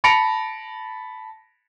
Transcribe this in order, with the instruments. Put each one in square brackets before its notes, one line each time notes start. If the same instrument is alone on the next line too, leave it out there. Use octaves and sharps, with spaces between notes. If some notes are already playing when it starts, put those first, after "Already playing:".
[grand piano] A5 B5 A#6 C#7 D7 F7